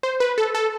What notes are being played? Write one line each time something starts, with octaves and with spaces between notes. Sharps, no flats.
C5
B4
A4
A4